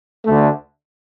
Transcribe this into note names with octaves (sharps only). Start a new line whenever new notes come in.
D2 D3 A3